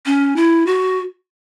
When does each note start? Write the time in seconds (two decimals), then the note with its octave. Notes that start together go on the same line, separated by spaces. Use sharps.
0.06 C#4
0.36 E4
0.66 F#4